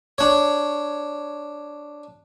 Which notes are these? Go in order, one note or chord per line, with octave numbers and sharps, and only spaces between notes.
D4 C#5